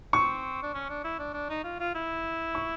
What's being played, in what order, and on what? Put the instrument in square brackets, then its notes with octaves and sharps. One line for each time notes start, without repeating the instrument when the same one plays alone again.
[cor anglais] C4 [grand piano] C#6
[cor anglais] D4
C#4
D4
E4
D4
D4
D#4
F4
F4
E4
[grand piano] C#6